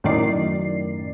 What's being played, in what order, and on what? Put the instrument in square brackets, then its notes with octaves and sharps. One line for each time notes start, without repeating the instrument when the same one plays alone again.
[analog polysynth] F#2 A2 D#3 D5 C7